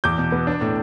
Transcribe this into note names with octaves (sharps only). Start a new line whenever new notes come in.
E2 D6 G6
B2
B3
D4
A2